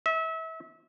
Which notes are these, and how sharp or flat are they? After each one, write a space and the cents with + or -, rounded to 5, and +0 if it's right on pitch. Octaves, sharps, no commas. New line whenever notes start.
E5 -30